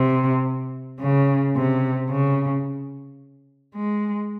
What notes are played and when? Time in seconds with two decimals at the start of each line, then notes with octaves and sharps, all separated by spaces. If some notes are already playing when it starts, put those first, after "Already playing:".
Already playing: C3
1.00 C#3
1.56 C3
2.10 C#3
3.75 G#3